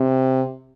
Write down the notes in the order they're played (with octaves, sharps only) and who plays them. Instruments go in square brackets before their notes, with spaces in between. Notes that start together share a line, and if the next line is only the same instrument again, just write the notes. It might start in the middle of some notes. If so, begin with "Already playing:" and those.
Already playing: [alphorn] C3